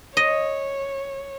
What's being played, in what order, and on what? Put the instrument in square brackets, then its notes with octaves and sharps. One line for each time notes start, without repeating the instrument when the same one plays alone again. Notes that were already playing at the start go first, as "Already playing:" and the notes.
[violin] C#5 [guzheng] D#5